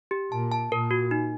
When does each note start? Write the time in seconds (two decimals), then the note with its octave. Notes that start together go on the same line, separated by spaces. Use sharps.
0.11 G4
0.31 A#2 A5
0.52 A5
0.71 A#2 A#4
0.91 F#4
1.11 D#4